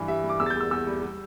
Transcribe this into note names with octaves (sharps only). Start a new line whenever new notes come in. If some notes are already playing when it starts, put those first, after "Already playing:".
Already playing: G2 E3
G3 E5
G3
D6
E2 E6
A6
G6
E2
E6
E2 E6
G3
G3